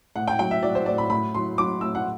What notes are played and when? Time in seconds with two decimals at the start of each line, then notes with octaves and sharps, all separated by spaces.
0.16 A2 F#5
0.28 G5
0.39 F#3 G5
0.51 E5
0.63 F#3 D5
0.75 C5
0.86 A2 D5
0.98 B5
1.10 A2 B5
1.34 F#3 C6
1.58 F#3 D6
1.81 A2 E6
1.95 F#5